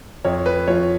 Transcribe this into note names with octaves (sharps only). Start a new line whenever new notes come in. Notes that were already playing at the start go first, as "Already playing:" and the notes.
F2 C#5
B4
F3 C#5